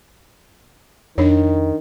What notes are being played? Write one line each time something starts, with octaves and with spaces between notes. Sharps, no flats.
F2 D#3 D4 C#5